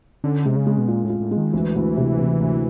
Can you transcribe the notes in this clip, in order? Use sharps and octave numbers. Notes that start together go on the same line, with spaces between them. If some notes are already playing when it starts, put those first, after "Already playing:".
D3 C#4
C3 G#3
C#3
G#3
B2
A#2 F4
A2
F4
A2
G#3
D#3
D2 E3
D2
C3
C3
D2